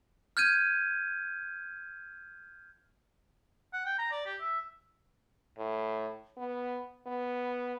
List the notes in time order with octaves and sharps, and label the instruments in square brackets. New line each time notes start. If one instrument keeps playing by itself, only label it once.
[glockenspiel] F6 G6 G#6 D#7
[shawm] F#5
G5
A#5
D5
G4
E5
[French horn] A2
B3
B3